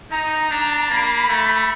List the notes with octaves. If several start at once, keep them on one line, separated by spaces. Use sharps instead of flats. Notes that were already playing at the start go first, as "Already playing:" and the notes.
D#4 A#5
D4
A#3 B5
A3